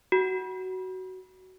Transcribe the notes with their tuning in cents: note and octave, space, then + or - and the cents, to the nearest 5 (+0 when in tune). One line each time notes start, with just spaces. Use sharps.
F#4 +15